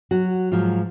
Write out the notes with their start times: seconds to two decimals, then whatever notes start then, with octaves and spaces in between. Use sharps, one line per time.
0.11 F#3 F#4
0.52 G#2 F3 F#3 F4